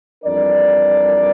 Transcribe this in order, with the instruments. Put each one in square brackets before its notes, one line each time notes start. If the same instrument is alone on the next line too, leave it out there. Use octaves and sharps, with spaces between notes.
[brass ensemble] F2 E3 G3 D4 A#4 D5